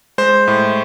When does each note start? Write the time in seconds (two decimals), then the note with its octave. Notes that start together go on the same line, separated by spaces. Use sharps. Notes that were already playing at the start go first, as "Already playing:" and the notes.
0.18 G#3 C5
0.47 A2